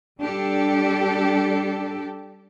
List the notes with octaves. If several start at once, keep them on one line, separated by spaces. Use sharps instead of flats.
G3 D4 G4 A4